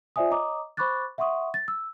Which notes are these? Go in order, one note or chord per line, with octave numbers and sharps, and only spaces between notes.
F4 C5 D5 E5 G#5 D#6
C#5 D#5 A#5 D6 D#6
C5 B5 C#6 D6 F#6 A6
E5 F#5 C6 C#6 D#6
A6
E6